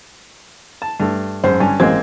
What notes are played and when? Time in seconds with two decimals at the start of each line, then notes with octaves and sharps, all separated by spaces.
0.82 A5
1.00 G2 A3
1.44 G#1 F#2 C5
1.60 G2 D3 C#4 G#5
1.80 A1 G#3 A#3 C4 G#6